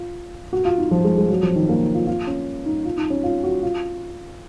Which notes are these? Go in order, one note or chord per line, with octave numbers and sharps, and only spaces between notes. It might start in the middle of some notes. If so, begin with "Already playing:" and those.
Already playing: F4
F#4
F4
D#4
F3
G#3
G#3
F#3
F3
D#3
A#3
D#4
F4
F4
C#4
D#4
F4
D#4
C#4
F4
F#4
F4